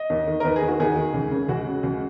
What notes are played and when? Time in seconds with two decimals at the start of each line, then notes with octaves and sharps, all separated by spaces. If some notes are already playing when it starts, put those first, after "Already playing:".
Already playing: D#5
0.10 D#2
0.27 D#3
0.40 A#4
0.45 D#2 B4
0.56 G#4
0.63 D#3
0.68 F#4
0.80 D#2 G#4
0.96 D#3
1.14 C#2
1.31 C#3
1.49 C#2 F#4
1.67 C#3
1.83 C#2